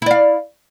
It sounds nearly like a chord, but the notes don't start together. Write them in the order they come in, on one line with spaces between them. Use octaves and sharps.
E4 D5 F5